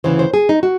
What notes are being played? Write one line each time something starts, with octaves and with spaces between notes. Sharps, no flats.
D2 C#3 E3 C5
C5
G#4
D#4
F#4